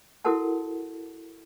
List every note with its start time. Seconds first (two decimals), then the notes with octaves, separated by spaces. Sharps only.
0.25 E4 F#4 A4 A#4 F#5 A5